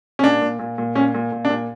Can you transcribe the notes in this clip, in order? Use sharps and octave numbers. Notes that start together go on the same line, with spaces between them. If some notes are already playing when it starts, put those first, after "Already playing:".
C#4
A#2 D4
A#2
A#2
A#2
A#2 C#4
A#2
A#2
D4
A#2